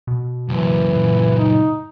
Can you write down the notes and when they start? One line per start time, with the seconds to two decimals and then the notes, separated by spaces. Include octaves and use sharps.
0.07 B2
0.49 C#2 F#2 E3
0.96 A#2
1.38 D#4